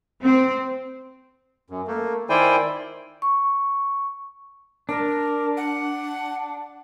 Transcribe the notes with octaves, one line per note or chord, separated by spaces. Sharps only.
C4
F#2
A3 A#3
D#3 E4 C5 D5 G5 G#5
C#6
D4 A#4
F#5